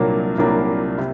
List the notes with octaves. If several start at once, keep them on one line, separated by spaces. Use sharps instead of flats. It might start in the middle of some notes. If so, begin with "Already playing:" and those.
Already playing: C2 A#2 F#3 A#3 D4
C2 A#2 F#3 A#3 D4
C3